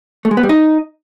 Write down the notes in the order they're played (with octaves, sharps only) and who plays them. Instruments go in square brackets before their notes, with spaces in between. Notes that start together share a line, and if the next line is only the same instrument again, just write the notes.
[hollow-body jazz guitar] A3
G#3
B3
G3
D#4